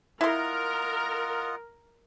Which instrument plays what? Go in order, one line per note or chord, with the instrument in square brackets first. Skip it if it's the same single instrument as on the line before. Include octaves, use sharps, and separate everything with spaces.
[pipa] E4 C6 [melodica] F4 D#5 F#5 [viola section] A#4